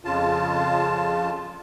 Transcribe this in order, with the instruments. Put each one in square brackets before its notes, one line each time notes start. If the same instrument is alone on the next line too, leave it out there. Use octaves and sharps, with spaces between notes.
[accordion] F2 C#3 F4 A5